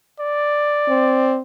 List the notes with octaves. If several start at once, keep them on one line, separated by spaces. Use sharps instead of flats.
D5
C4